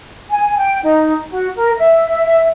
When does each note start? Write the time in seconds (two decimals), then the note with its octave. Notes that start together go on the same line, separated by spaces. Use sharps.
0.30 G#5
0.58 G5
0.83 D#4
1.31 F#4
1.56 A#4
1.77 E5